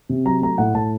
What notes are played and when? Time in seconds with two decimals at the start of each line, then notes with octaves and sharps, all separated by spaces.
0.09 C3
0.25 F#3 A#5
0.42 A3 A#5
0.58 A2 F#5
0.74 A2 A5